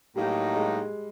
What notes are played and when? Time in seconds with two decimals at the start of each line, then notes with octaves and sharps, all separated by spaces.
0.16 A2 F#3 G3 A#3 D#4
0.55 G#3